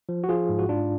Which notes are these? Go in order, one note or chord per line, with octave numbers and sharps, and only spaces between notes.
F3
F#4
F3 F4 G#4
G#2
F#4
G#2 D4 F4